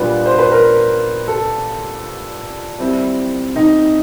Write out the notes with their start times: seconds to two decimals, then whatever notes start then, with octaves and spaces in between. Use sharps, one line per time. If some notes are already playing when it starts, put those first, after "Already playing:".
Already playing: A#2 G3 B3 D4 F4 B4
0.26 C5
0.39 B4
0.51 A#4
1.28 A4
2.79 G3 C4 E4
3.56 D#4